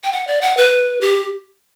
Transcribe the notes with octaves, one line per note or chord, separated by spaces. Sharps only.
G5
F#5
D5
F#5
B4
G4